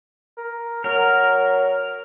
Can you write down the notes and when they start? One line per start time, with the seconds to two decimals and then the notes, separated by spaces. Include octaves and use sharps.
0.37 A#4
0.84 F#3 A#4